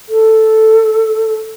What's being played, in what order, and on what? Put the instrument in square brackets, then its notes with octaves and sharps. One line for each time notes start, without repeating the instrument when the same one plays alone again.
[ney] A4